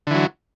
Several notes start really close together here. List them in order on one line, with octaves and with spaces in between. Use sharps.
D3 E3 F#3